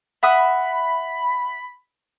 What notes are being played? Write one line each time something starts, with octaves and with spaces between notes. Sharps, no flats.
E5 F#5 B5 D#6